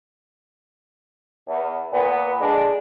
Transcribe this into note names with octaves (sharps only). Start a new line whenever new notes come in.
E2
A#2 B3
D3 G#3 D4